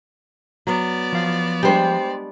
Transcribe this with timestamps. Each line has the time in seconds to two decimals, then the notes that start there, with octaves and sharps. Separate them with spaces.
0.67 F#3 B3 D5
1.12 F3 F5
1.63 G3 G#3 D4 C5 G5